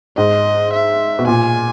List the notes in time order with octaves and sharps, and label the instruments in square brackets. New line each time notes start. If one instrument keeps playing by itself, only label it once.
[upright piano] G#2 [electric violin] D#5
[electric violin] E5
[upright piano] B2
[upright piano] A#2 [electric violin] G#5